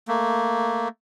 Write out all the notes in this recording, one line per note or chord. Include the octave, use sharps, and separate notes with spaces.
A3 A#3